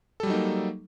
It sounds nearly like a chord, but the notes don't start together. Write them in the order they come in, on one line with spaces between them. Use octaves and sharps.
A4 G3 F#3 D#4 A#3